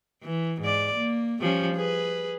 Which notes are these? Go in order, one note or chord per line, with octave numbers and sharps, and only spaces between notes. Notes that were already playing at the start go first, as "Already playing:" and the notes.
E3
G#2 D5
A#3
F3 G3 C#4
G#4 B4